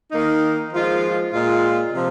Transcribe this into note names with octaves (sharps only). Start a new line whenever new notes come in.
D#3 A#3 D#4
F3 G#3 F4
A#2 G#3 F4
C3 F3